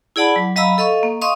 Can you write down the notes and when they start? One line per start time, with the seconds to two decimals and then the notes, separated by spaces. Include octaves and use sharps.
0.16 E4 G#4 D5 F#5 A5 B5
0.36 F#3
0.56 F#3 D#5 F5 A#5 B5 E6
0.78 A4 D#5 F5 C#6
1.03 A#3
1.22 D#5 F5 C6 C#6 D#6